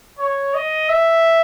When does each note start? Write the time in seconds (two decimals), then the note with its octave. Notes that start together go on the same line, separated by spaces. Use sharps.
0.19 C#5
0.54 D#5
0.89 E5